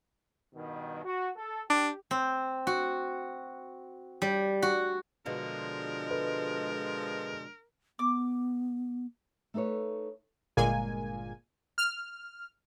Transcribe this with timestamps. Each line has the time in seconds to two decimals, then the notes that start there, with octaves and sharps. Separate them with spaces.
0.55 G2 B2 D#3
1.05 F#4
1.36 A4
1.70 D4 G4
2.11 C4
2.67 F#4
4.22 G3
4.62 F#4
5.26 B2 D3 F3 G#3 F4 A#4
6.11 A4 B4
7.99 B3 D6
9.54 A3 D#4 A4 B4 C#5
10.57 G1 A#2 G#3 A#3 G#5
11.78 F6